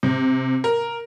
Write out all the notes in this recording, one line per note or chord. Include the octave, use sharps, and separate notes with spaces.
C3
A#4